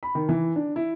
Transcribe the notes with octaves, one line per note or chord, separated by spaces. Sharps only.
B5
D#3
E3
D4
E4